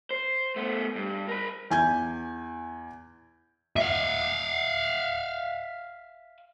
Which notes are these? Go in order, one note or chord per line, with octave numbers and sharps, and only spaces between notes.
C5
A3 B3
G2
A#4 B5
E2 G#5 G6 G#6
E5 F5